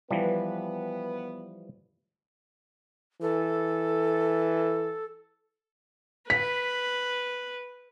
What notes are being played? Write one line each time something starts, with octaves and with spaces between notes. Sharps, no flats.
E3 F3 G3 B3 B4
E3 A4
B4 B6